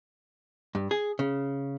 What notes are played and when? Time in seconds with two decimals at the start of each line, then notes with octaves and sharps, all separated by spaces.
0.75 G2
0.91 G#4
1.19 C#3